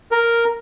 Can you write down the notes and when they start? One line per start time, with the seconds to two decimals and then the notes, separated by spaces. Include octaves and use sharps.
0.11 A#4